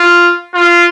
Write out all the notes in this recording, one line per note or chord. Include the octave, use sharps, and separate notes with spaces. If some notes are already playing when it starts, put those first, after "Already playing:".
Already playing: F4
F4